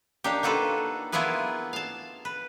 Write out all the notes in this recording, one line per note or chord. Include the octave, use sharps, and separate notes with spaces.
A#3 D4 D#4 G4
A#3 F4 F#4 A4 B4
A#3 B3 E4 F4 G#4 B4
F5 A5
B4